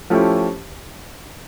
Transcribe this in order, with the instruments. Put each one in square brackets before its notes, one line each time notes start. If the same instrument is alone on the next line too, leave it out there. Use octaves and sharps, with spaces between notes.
[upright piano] F3 A3 C#4 E4 G4